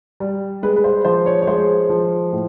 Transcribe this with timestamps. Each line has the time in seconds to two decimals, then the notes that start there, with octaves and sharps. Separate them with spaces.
0.20 G3
0.63 G#3 B4
0.76 B4
0.84 C5
1.05 F3 C5
1.26 C#5
1.42 C#5
1.47 G#3 C5
1.90 F3
2.33 A2